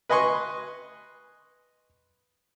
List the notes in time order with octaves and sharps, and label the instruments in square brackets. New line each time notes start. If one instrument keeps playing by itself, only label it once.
[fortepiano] B4 D#5 G#5 C6 C#6